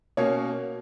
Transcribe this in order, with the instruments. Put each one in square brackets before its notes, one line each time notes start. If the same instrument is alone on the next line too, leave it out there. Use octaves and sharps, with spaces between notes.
[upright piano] B2 A#3 C#4 C#5